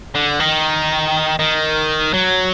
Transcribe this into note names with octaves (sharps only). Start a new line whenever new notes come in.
D3
D#3
D#3
F#3